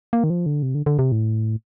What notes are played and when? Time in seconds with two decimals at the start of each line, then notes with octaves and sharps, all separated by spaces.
0.13 A#3
0.24 D#3
0.30 F3
0.46 D3
0.63 C3
0.75 D3
0.86 D3
0.99 C3
1.12 A2